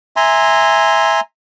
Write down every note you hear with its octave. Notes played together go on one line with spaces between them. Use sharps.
E5 G#5 A#5 C6